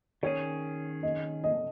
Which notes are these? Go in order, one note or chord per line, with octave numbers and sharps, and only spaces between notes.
D#3 C#4 G#4 C#5
D#5
D#5